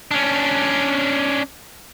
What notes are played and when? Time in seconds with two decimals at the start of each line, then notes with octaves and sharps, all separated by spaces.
0.11 C#4 D4